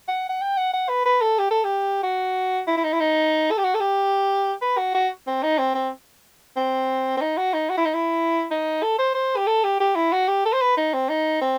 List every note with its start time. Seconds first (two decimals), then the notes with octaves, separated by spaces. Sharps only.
0.08 F#5
0.29 F#5
0.41 G5
0.57 F#5
0.74 F#5
0.89 B4
1.06 B4
1.21 A4
1.39 G4
1.51 A4
1.64 G4
2.03 F#4
2.67 E4
2.77 E4
2.84 D#4
2.93 E4
3.00 D#4
3.51 A4
3.58 G4
3.64 F#4
3.75 A4
3.80 G4
4.62 B4
4.78 F#4
4.94 F#4
5.27 C4
5.43 D#4
5.59 C4
5.75 C4
6.56 C4
7.17 C4
7.21 D#4
7.38 F#4
7.54 D#4
7.70 F#4
7.78 E4
7.85 D#4
7.94 E4
8.51 D#4
8.83 A4
8.99 C5
9.15 C5
9.37 G4
9.47 A4
9.64 G4
9.80 G4
9.96 E4
10.13 F#4
10.28 G4
10.45 A4
10.53 C5
10.62 B4
10.77 D#4
10.94 C4
11.09 D#4
11.41 C4